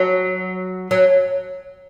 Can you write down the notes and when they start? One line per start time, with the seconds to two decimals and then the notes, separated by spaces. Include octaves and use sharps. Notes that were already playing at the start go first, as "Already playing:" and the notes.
Already playing: F#3
0.91 F#3